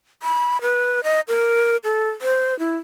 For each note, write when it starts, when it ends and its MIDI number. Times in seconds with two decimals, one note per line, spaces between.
0.23 0.61 83
0.62 1.03 71
1.04 1.21 75
1.28 1.77 70
1.84 2.10 69
2.22 2.57 72
2.59 2.76 64